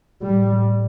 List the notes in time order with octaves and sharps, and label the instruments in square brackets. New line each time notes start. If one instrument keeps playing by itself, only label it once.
[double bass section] A2 G3